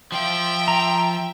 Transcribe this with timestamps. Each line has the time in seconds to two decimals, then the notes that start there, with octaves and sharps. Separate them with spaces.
0.12 F3 F4 E5 G5
0.68 A#5